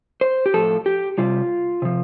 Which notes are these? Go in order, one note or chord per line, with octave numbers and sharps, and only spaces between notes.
C5
G4
A2 F3 A4
G4
C3 G3 F4
C3 F3